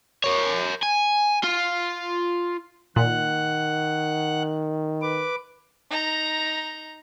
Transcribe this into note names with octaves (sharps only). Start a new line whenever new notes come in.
A#4 C#5
G#5
F4
A#2 D#3 F#5 F#6
B4 D6
D#4 A#5